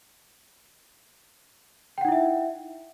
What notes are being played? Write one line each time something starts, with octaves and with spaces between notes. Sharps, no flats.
D#4 E4 E5 F#5 G5